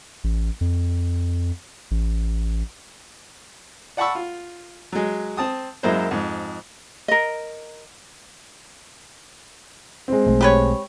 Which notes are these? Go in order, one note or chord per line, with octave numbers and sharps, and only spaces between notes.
A1
F2
A1
D5 F#5 A5 B5 C#6 E6
F4
F#3 G#3
C4 A5 D#6
F#2 G#3 A#3 E4 C5
F2 G#2
A#4 D#5
G#3 C4
B1 A3
G4 B4 C#5